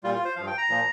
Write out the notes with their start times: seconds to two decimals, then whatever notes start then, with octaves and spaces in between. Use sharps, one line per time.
0.04 A#2 G3 F4
0.14 F4
0.25 C5
0.36 G2 F3 F5
0.47 G5
0.58 A#5
0.69 A#2 F3